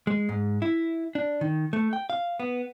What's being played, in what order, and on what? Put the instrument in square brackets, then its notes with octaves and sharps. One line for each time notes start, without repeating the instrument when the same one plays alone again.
[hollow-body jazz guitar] G#3
G#2
E4
D4
D#3
A3
G5
F5
B3